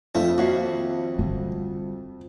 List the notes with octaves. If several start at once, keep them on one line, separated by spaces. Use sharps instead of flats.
F2 F3 A3
D#2 F#4 E5 F5
D3 G3